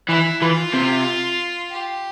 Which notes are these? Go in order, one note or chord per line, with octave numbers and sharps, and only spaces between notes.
E3 E4
E3 F4
C3
G4